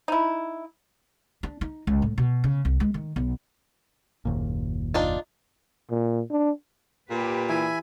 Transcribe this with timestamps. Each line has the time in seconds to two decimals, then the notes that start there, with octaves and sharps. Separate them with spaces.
0.08 D#4 E4
1.43 D4
1.61 D#4
1.87 C#2
2.02 A2
2.18 B2
2.44 C#3
2.65 C2
2.80 G#3
2.94 D#3
3.16 B1
4.25 F#1 D#2 A#2
4.94 D4 D#4 F4
5.90 A#2
6.31 D4
7.10 A#2 G4 B4
7.49 E3 E5 G#5 B5